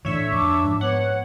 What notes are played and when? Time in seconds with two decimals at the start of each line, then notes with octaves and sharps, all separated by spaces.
0.05 A2 D3 E3 C#5 E5
0.32 F2 D4 D6
0.64 G#2 F3
0.81 B3 C#5 F#5